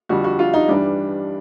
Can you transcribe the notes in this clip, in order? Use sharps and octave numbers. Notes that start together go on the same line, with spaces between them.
F2 D3 G3 F#4
F#4
F4
D#4
G2 E3 G3 D4